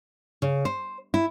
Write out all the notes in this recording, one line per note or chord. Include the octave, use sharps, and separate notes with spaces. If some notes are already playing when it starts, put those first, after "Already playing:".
C#3
C5
E4